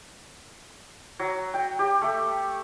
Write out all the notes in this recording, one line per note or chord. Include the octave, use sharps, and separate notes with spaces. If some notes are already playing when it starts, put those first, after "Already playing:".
F#3
G5
G4
A3